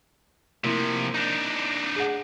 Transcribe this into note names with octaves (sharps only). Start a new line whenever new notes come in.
C3 F3 A#3 E4
D4 D#4
G#4 F#5